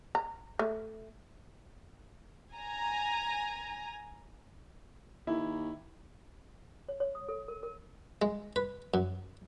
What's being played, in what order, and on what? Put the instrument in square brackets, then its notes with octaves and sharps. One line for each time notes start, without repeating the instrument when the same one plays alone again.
[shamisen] A#5
A3
[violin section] G#5 A#5
[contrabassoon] D#2 [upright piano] E4
[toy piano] C#5
C#5
D#6
A4
A#4
A#4
[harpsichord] G#3
B4
F#2